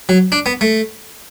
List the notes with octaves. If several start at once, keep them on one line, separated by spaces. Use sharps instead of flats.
F#3
D4
B3
A3